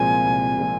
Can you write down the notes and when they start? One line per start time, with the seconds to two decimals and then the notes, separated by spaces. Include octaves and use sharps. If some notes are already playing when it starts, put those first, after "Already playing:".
Already playing: C2 A#2 F3 G#3 C4 G#5
0.25 C2
0.59 A#2 F3 G#3 C4